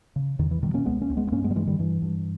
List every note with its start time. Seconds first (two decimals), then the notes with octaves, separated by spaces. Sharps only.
0.16 C#3
0.39 E2 D#3
0.51 E3
0.62 B2 D#3 G3
0.74 A#3 C#4
0.86 C#2 G#3 B3
1.01 A#3 C#4
1.10 C#2
1.17 G#3 B3
1.27 B3
1.32 G2 A#3 C#4
1.44 G#3 B3
1.51 G3
1.56 G2 E3 G#3
1.67 D#3 G3
1.79 G2 E3
2.02 G2